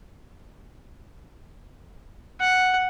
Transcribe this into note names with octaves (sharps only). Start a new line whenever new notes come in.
F#5